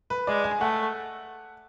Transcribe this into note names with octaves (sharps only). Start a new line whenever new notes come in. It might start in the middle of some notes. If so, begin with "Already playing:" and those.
B4
G#3 D5
G#5
A3 F#5